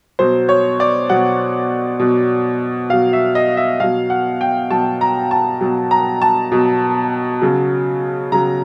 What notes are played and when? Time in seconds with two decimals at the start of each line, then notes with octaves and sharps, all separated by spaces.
0.19 B2 F#3 C5
0.49 C#5
0.80 D5
1.09 B2 F#3 F#5
2.00 B2 F#3
2.90 B2 F#3 F5
3.13 E5
3.35 D#5
3.57 E5
3.80 B2 F#3 F5
4.10 F#5
4.41 G5
4.70 B2 F#3 A5
5.01 A#5
5.31 A5
5.61 B2 F#3
5.91 A#5
6.22 A5
6.52 B2 F#3
7.41 C#3 F#3
8.32 C#3 F#3 A#5